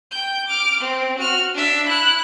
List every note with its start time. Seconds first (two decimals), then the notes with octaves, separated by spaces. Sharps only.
0.11 G5 G6
0.46 D6 F6
0.80 C4
1.18 F#4 F6
1.54 D4 E5
1.88 E4 F#6